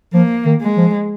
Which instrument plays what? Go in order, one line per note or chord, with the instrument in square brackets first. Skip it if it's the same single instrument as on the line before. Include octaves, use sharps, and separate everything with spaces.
[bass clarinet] F3 [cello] A#3
[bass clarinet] D#3
[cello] G#3
[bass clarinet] F3